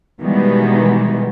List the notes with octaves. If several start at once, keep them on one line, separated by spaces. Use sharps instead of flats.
B2 D#3 E3 G3 G#3 B3